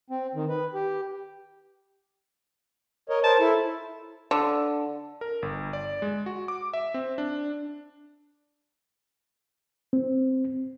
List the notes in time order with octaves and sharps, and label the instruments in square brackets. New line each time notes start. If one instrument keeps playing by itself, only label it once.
[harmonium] C4
D#3
B4
G4
A#4 C#5 D#5
[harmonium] A#4 C5 [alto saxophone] A5
[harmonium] E4 [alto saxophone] A4
[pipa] D3
[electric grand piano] A#4
G1
D5
G#3
F#4
D6
E5
C4
D4
[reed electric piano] C4